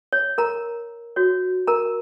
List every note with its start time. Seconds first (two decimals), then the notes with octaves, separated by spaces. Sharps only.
0.13 C#5
0.38 A#4 A#5
1.16 F#4 C#5
1.67 A#4 A#5